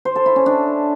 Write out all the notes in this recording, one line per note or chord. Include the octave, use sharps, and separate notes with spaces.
C5
A4
E4
C#4
D4